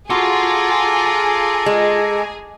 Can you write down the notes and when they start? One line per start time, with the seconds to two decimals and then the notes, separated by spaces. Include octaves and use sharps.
0.10 F4 F#4 G#4 A4 A#5 C6 D6
1.66 G#3